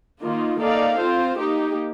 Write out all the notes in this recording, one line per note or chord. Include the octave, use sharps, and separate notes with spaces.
D#3 A#3 F4
A#3 D#4 A4 D5 F5
C4 F4 C5
A#3 D#4 G4